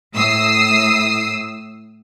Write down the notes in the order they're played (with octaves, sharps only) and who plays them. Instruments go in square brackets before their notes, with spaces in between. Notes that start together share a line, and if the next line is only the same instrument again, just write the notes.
[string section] A2 D#6 E6 C7